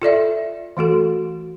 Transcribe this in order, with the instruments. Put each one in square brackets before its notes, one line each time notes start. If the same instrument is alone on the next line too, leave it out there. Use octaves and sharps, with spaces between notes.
[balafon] F4 A4 D5 E5
E3 A3 F#4 A4